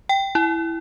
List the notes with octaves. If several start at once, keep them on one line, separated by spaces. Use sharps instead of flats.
G5
E4